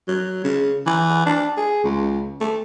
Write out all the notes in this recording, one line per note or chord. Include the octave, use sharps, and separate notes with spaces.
F#3
C#3
E3
D4
G#4
C#2
A3